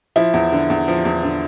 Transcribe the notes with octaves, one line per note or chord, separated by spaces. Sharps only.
F3 E4
E2
D3
E2
F3
E2
D3